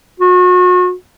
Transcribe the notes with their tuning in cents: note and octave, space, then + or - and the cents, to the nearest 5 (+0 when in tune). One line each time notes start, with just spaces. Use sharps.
F#4 -35